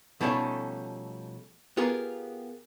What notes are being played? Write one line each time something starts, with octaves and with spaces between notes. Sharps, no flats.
B2 F3 G3 A3 C#4 D#4
B3 F4 G4 G#4 A#4